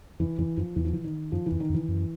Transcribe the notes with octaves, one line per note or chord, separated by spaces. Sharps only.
F2 E3
F2 E3
F#2 F3
E2 E3
F3
E3
D#3
F#2 F3
E3
F2
D#3
F2
E3
F#2